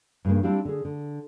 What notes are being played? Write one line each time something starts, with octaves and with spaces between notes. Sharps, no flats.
G2 C#3 A#3
G3 C4 D4 E4 G4 F5
D3 G#4
D3